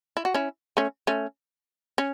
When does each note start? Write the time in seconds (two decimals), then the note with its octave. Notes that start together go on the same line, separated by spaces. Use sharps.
0.17 E4
0.25 F#4
0.34 C#4 E4
0.77 A3 C#4
1.07 A3 C#4
1.98 C#4